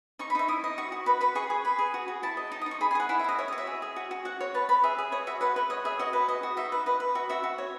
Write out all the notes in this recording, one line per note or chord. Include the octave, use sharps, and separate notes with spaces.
D#4 C#6
B5
D#4 E5
E4 D#6
D#5
F#4 C#6
F#4
B4 B5
B4 B5
G#4 C#6
G#4
B4 B5
G#4
F#4
F#4
E4 A5
D#5
D#4 A5
D#6
D#4
C#6
G#4 B5
G#5
G#4 F#5
E4 F#5
E5
E4 D#5
C#5 E5
D#5
F#4
E5
G#4
G#4
F#4
F#4
F#4 F#5
C#5
B4 A5
B4 B5
G#4 E5
G#4
C#5 D#5
F#4 E5
B4 F#5
B4 E5
C#5 D#5
G#4 E5
F#4 D#5
B4
D#5 E5
F#4
D#4 E5
B4
B4 D#5
B4
F#4 E5
F#4 E5
F#4
C#5